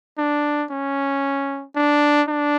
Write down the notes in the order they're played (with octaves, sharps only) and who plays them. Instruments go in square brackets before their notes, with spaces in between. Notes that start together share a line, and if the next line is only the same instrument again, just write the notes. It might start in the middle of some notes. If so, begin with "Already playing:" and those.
[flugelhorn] D4
C#4
D4
D4